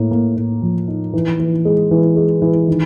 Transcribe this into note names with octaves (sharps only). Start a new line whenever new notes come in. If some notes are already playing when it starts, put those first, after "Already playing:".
Already playing: A2 A#3
A#3
A2
F3
D#4
E3
E3
G#3
E3
G#3
E3
D#3